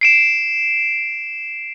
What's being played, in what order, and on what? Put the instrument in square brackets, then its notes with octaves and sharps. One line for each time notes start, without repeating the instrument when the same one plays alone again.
[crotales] C7 D7 E7